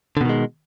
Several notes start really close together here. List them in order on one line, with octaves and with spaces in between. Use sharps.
D3 B2 D#3 G#3